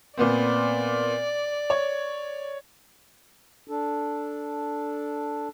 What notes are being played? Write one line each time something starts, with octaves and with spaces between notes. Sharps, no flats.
A#2 B3 C4 D5
C#5
D4 A4